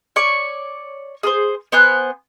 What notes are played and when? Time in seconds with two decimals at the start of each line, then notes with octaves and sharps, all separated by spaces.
0.16 C#5 D5 C#6
1.23 G#4 A#4 C5
1.72 B3 C5 G#5 F#6